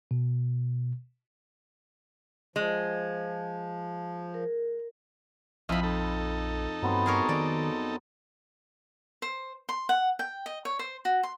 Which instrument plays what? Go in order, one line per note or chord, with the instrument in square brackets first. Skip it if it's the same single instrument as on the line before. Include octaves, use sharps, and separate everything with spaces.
[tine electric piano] B2
[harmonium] F3 [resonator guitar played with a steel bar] G#3
[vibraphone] A#4
[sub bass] A#1 [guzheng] F2 B5 [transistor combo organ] E4 F4 D#5
[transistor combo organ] D#4 A4
[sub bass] G2 [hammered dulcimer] F#3 B3 C4
[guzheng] G#4 A#4 C#5
[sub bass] D#3 [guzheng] D5
[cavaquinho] C5
C6
F#5
G5
D#5
C#5
C5
F#4
C6